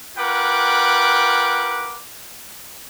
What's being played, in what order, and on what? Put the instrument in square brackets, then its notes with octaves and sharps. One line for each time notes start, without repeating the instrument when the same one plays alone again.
[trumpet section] F4 A#4 B4 F#5 G5 D6